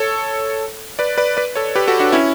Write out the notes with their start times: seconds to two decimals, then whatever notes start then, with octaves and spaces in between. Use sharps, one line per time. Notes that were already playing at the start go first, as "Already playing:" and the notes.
Already playing: A4 C#5
0.99 B4 D5
1.18 B4 D5
1.37 B4 D5
1.56 A4 C#5
1.75 G4 B4
1.87 F#4 A4
2.00 D4 F#4
2.12 C#4 E4